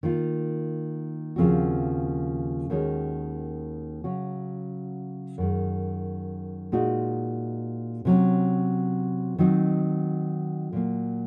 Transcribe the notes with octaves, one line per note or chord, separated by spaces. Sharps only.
D#3 A#3 F4
D#2 C#3 F3 C4 F#4
D#2 D#3 G#3 C#4 F#4
C#3 F#3 C#4 F#4
F#2 D#3 G#3
A#2 G#3 D#4 F#4
C3 F#3 C#4
D#3 F#3 C4 D#4 F#4
A#2 F#3 A#3